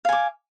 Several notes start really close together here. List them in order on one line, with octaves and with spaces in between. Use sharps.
F5 G#5 D6